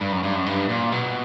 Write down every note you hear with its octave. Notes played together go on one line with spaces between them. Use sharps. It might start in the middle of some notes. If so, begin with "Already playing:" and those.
G2
F#2
G2
F#2
G2
A#2
B2